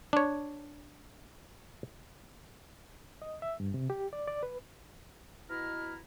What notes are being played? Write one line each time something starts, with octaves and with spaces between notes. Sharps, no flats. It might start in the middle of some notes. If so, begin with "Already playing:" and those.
D4 C#5
D#5
E5
G2
C3
G4
D5
D5
B4
B2 E4 A#5 F6